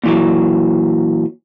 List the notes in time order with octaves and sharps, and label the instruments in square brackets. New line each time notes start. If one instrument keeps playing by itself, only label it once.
[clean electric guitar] A#2 E3 F#3